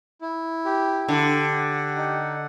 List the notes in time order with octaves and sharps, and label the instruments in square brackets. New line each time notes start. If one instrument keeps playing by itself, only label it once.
[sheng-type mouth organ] E4
G4
[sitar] D3 [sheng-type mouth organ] G4
[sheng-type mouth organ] F#5
D#4